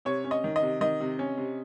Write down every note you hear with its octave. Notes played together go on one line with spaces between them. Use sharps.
C3 C#5
C#4
D#5
D#3
D#5
C3
D#3 D#5
C3
C#4
C3